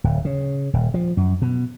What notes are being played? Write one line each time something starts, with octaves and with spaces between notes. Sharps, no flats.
D1
C#3
D#1
F3
F#2
B2